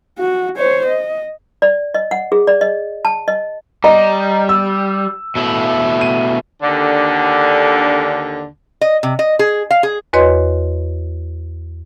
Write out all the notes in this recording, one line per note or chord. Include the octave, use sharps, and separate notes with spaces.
F#4
C5 C#5
D#5
D5
D#5
F#5
G#4
D5
D#5
A5
D#5
G3 D#5 A#5
E6
B2 A3 E4
D#7
D#2 D3
D#5
C3
D#5
G#4
F5
G#4
E2 F#4 B4 C#5 D#5 C6